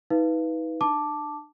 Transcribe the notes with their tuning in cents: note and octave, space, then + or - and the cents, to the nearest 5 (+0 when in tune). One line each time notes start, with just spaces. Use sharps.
D#4 +45 B4 +0 F5 -25
D4 +40 A5 +0 D6 +0